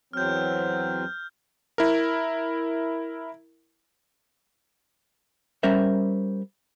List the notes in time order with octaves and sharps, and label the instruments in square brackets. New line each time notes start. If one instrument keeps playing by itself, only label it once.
[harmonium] E2 F#3 C4 [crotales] F6 G6
[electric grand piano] E4 A#4
[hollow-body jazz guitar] G3 C#4 A#4 C5 E5